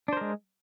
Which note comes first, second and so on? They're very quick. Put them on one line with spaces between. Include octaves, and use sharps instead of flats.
D4 C5 A#4 G#3